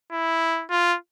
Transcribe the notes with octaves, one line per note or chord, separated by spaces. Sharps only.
E4
F4